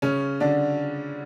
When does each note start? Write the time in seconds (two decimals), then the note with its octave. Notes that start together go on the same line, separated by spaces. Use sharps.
0.02 C#3 C#4
0.40 D3 D4